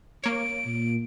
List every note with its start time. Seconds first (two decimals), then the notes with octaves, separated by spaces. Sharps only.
0.24 A#3 C#5 D7
0.65 A#2